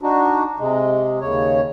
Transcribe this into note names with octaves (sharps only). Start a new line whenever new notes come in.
D4 D#4 F#4
C3 G#3
D#2 C#3 C#5